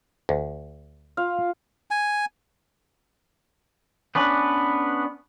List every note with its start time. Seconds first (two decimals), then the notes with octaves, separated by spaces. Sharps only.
0.29 D2
1.17 F4 F5
1.91 G#5
4.15 B3 C#4 D4 B4